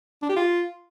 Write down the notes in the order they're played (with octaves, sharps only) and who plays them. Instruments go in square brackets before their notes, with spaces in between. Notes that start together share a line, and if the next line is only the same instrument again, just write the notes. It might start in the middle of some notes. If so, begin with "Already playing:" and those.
[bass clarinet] D4
G4
F4